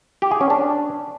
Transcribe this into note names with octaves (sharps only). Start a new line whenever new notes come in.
G4
G#4
C#4
D4